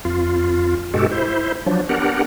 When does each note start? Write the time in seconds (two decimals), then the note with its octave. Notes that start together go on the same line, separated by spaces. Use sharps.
0.05 F2 F4
0.94 G2 B2 G#3 F#4 G4 A4
1.11 E4 C5
1.66 F3 F#3 D4
1.89 B3 D4 G4 A#4 F#5